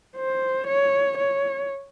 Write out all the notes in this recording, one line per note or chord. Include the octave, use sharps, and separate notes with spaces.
C5
C#5
C#5